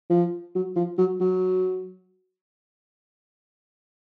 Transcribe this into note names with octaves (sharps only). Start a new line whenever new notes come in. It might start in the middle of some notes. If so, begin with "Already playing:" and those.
F3
F#3
F3
F#3
F#3